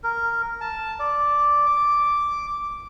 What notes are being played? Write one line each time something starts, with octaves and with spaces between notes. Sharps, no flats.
A#4
A5
D5
D6